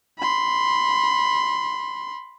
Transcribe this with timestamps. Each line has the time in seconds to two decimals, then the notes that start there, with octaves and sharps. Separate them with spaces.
0.19 B5 C6